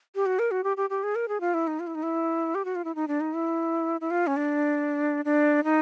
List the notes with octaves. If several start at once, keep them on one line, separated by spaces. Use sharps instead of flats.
G4
F#4
A#4
F#4
G4
G4
G4
G#4
A#4
G#4
F4
E4
D#4
F4
E4
D#4
E4
G4
F#4
F4
E4
D#4
D4
D#4
E4
E4
F4
C#4
D4
D4
D#4